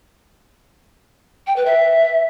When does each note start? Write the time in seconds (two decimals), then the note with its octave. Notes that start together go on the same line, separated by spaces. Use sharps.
1.47 G5
1.56 B4
1.66 E5